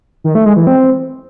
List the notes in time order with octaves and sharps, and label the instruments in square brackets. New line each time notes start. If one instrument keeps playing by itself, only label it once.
[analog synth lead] D#3
A3
G#3
E3
C4